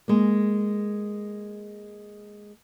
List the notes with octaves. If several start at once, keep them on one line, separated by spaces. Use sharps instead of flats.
G#3 A#3